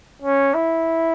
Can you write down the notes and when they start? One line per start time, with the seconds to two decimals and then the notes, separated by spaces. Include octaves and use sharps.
0.22 C#4
0.54 E4